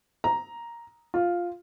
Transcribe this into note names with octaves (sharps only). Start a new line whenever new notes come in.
A#5
F4